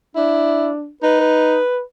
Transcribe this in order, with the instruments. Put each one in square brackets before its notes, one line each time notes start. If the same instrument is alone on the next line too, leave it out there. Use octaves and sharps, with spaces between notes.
[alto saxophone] D4 [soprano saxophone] E4
[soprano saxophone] D#4 [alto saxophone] B4
[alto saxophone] B4